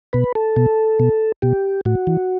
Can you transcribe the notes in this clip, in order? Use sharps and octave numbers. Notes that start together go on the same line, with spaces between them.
B2 B4
A4
B2
B2
B2 G4
A2 F#4
E3